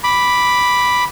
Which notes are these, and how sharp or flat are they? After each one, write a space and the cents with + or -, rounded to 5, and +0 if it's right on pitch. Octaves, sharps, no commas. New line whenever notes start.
B5 +0 D6 +0